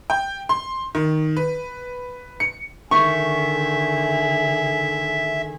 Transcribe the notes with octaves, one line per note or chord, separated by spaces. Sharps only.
G5
C6
D#3
B4
C#7
D3 D#3 A3 G#4 E5 C#6